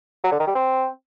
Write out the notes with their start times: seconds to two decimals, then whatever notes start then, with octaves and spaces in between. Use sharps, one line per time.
0.24 F#3
0.32 D3
0.40 D#3
0.47 G3
0.55 C4